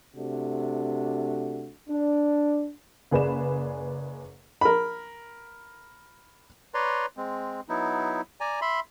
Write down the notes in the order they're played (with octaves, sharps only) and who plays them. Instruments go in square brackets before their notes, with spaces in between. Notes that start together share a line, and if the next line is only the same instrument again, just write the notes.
[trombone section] C3 A3 D4 F#4
D4
[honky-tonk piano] F#1 G#4 B4 D5 E7
[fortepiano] A#4 B5
[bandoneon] B4 C#5 D5 A#5 C6
G#3 C4
F#3 B3 D#4 E4
D5 G#5 A#5
E5 B5 C6